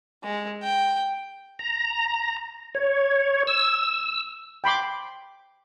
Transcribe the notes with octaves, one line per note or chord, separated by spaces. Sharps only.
G#3
G5
A#5
C#5
E6
G5 B5 C6 D6